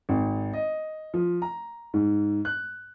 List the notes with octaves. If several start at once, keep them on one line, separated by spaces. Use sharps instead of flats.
G#1
D#5
F3
A#5
G#2
F#6